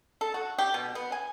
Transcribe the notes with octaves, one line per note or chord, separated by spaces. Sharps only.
A4
F#4
G4
B2
B3
G#5